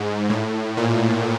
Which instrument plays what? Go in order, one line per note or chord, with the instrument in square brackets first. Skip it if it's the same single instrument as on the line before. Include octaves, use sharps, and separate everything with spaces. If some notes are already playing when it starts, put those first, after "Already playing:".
Already playing: [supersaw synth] G#2
A2
A#2